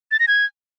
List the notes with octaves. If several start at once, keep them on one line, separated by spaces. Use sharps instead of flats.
A6
A#6
G#6